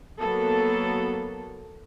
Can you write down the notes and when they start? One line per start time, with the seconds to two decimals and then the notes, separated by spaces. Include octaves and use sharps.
0.19 F#3 A#3 B3 A4